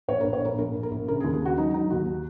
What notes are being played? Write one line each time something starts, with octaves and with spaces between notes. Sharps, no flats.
A#1 C#5
A#1 A#4
C#5
A#1 A#4
A#1 A#4
A#1
A#4
A#1
C#3 A#4
G#4
D#2
G#4
C#3 F#4
F#3 D#4
F#3 D#4
D#2 F#4